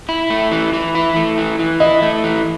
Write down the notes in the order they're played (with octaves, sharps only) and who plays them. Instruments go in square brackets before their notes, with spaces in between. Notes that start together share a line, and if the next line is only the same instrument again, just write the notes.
[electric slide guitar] E4
A3
E3
E3
E4
A3
E3
E3
[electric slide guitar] E4 [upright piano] D#5
[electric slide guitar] A3
E3